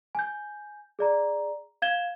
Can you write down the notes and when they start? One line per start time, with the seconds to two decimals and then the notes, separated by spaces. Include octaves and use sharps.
0.15 G#5 G6
0.99 G#4 D5 A#5
1.82 F5 G6 G#6 E7 G7